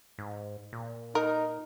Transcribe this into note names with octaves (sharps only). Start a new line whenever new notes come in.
G#2
A#2
D#4 A#4